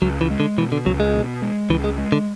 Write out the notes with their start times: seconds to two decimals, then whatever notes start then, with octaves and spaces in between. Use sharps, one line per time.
0.02 C#2 F#3
0.21 E3
0.31 G#3
0.40 D3
0.58 B2 E3
0.72 D3
0.86 C#2 F#3
1.00 G#3
1.14 B2
1.42 G#3
1.70 C#2 E3
1.84 G#3
1.98 G#3
2.12 D3